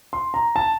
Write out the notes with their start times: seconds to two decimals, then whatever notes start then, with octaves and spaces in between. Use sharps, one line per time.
0.13 C6
0.34 A#5
0.56 A5